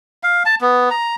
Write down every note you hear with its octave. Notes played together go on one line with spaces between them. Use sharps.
F5
A5
B3
A#5